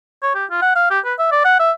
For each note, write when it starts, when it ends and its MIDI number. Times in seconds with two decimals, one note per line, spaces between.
0.22 0.32 73
0.35 0.45 67
0.51 0.61 65
0.62 0.72 78
0.76 0.87 77
0.90 0.99 67
1.05 1.14 71
1.19 1.31 76
1.32 1.41 74
1.45 1.57 78
1.59 1.71 76